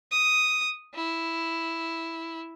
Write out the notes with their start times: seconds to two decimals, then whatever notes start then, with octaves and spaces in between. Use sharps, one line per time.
0.11 D#6
0.95 E4